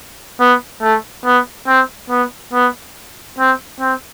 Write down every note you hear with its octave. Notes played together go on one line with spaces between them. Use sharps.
B3
A3
B3
C4
B3
B3
C4
C4